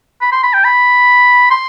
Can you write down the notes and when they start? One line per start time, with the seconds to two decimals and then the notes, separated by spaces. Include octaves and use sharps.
0.22 B5
0.32 C6
0.43 B5
0.54 G5
0.65 B5
1.51 C6